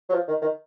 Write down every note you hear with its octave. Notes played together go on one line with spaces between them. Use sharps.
F#3
F3
D#3
D#3